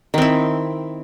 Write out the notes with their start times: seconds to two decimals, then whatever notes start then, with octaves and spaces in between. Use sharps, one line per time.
0.14 D#3
0.18 C4
0.22 E4